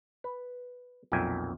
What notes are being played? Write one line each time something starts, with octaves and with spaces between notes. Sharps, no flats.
B4
B1 F2 A#2 E5 G5 G#5